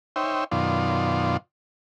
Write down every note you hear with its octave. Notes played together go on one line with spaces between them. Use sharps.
D#4 C5 C#5 E5 G5
F#2 B2 D#3 F4 D5 C6